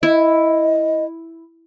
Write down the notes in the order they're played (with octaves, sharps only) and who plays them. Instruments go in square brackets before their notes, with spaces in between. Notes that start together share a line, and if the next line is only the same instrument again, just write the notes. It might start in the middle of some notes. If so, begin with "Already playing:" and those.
[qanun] E4 [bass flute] D#5